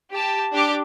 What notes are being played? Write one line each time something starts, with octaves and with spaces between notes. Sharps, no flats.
G4 A5
D4 G4 D6